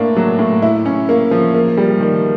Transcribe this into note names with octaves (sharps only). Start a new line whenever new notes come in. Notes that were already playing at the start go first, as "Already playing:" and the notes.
Already playing: A2 A#3 D4
F#3
A2
E4
C#4
A#3
F3
A#3
G3
D#3